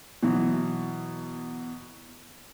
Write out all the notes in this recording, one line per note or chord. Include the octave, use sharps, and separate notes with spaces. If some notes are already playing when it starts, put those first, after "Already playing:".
B2 E3 F#3